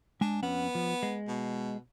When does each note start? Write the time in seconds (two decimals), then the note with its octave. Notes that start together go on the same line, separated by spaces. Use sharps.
0.21 G#3 D4 G#5
0.42 F2 B3 C#4 F#5
0.75 F3
1.03 G#3
1.28 B2